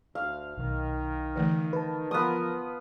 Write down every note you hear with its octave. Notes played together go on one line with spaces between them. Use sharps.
D2 F5
B1 D#3
D3 E3 A3
B4 A5
F3 B3 F4 A#4 D#6